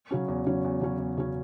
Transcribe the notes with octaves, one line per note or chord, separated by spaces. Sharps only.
C#3 F#3 C#4
E2
C#3 F#3 C#4
E2
C#3 F#3 C#4
E2
C#3 F#3 C#4